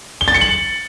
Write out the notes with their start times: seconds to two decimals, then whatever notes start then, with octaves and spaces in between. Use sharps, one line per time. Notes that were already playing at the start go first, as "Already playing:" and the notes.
0.21 G7
0.28 A6
0.34 C#7
0.41 F#7